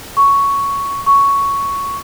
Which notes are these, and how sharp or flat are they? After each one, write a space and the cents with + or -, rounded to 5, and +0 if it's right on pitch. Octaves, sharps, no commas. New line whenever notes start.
C#6 +5
C#6 +5